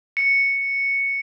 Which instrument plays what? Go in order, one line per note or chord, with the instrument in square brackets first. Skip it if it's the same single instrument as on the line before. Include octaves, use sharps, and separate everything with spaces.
[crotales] C#7